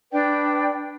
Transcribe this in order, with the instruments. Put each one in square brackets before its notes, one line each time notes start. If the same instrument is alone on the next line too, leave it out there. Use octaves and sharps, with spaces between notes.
[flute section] D4 B4 D5 G5